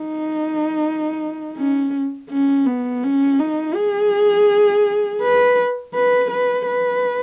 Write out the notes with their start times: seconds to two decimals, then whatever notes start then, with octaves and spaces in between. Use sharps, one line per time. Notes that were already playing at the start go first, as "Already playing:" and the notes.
Already playing: D#4
1.57 C#4
2.30 C#4
2.66 B3
3.03 C#4
3.39 D#4
3.75 G#4
5.22 B4
5.94 B4
6.31 B4
6.67 B4